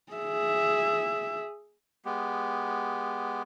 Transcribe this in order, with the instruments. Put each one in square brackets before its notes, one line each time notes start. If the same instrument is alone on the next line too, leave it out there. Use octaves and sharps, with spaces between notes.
[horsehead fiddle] G#4 E5
[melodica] G#3 B3 G4